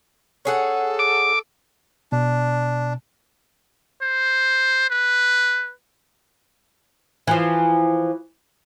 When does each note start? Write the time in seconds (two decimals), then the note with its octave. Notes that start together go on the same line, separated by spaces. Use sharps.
0.45 C#4 G#4 A4 F#5
0.99 D6
2.12 B2 D4
4.03 C5
4.90 B4
7.27 E3 F3